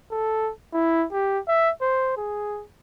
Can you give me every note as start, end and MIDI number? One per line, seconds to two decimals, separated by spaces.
0.11 0.52 69
0.73 1.06 64
1.12 1.39 67
1.48 1.71 76
1.81 2.13 72
2.17 2.63 68